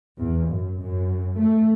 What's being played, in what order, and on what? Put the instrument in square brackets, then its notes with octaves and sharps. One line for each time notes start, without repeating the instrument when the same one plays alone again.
[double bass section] E2
F#2
F#2
A3